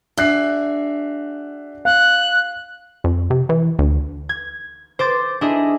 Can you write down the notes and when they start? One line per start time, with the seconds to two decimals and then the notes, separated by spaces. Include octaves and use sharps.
0.17 D4 F#4 G#4 E5 F#6 C7
1.85 F5 F#6
3.04 F2
3.30 C3
3.49 E3
3.79 D2
4.29 G#6
4.99 C5 D6 A6
5.41 D4 E4 G#4 D#5 E5